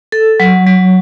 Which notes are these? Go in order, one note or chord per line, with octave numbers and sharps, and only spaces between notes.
A4
F#3
F#3